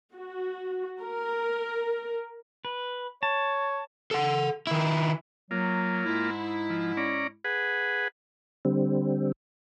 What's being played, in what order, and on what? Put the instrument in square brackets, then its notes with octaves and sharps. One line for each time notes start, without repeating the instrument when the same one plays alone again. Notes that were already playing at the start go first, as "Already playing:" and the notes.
[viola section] F#4
A#4
[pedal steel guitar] B4
[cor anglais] C#5 [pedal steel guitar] A5
[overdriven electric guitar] A4 F#5
D#3 E4
[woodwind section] F#3 [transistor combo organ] A#3 F4
[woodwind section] G#2 G#3 E4
[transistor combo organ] F3
C#4 D5 A#5
G#4 B4 F#5
[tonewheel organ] D3 G3 C4